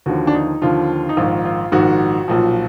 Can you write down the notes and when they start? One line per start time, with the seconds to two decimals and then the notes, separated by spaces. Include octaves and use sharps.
0.06 D#2 D3 F3 F#4
0.27 D4
0.34 D#4
0.62 D#2 D3 F3 F4
1.09 D#4
1.17 A#1 G#2 D#3 F4
1.45 F4
1.72 A#1 G#2 D#3 F#4
2.28 B1 A#2 F3